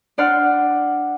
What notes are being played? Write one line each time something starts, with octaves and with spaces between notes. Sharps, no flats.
D4 D5 F#5 C6 F6